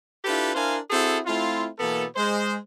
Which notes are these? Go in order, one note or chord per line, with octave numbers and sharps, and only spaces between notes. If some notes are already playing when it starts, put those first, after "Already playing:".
D4 E4 F4 G4 A4 B4
D4 E4 A#4 C5 F5 G#5
C4 E4 F#4 G#4 A4
A3 C4 E4 F4
B2 E3 A#3 B3 A4
G#3 C5